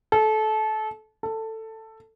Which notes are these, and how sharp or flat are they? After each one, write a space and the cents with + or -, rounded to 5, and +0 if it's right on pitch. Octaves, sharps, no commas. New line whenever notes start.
A4 -25
A4 +10